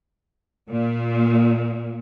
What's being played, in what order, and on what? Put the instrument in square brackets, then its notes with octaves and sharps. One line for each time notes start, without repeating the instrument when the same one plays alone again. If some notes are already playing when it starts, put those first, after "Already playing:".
[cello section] A#2